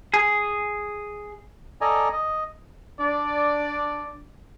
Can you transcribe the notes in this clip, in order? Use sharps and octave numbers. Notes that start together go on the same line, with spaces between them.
G#4
A4 D5 D#5 G#5 A#5
D#5
D4 D5